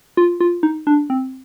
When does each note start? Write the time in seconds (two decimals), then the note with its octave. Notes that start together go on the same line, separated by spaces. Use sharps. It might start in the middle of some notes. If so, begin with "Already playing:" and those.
0.17 F4
0.40 F4
0.63 D#4
0.87 D4
1.10 C4